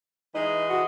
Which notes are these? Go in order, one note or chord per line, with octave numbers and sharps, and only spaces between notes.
E3 G#3 D#4 D#5
F#4